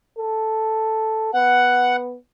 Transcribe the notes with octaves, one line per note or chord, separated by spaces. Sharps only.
A4
B3 F#5